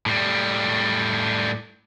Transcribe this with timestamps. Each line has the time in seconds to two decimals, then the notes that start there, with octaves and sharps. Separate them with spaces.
0.06 A2 G3